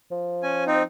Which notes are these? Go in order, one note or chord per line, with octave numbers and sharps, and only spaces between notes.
F3
C#4 G#5
C4 D#4